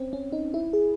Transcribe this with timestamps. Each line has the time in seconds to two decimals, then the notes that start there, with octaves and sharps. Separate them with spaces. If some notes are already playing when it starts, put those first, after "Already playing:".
Already playing: C4 C#4
0.13 C#4
0.32 D#4
0.54 E4
0.73 G#4